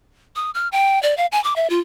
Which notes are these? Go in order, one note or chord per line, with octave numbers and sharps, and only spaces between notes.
D#6
F6
G5
D5
F5
G#5
D6
E5
F4